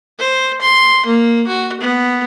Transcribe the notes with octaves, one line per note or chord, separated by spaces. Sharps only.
C5
C6
A#3
F#4
B3